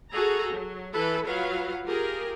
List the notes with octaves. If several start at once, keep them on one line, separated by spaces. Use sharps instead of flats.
F#4 G#4 A4 A#5
F#3
E3 E4 A4 B4
F#3 F4 B4 F5 F#5
F4 G4 G#4 A#4